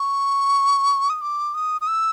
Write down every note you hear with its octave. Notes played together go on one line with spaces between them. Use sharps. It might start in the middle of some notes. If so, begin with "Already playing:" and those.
Already playing: C#6
D#6
D6
D#6
D#6
E6